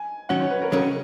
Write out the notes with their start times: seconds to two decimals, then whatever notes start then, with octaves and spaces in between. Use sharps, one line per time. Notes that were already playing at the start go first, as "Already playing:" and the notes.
Already playing: G#5
0.29 D#3 F#3 C#4 F#5
0.41 C#5
0.50 B4
0.62 A#4
0.72 D#2 C#3 F#3 C#4 A#4